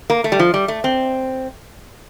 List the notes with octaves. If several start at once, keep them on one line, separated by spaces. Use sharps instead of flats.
A#3
A3
G3
F3
G3
A3
C4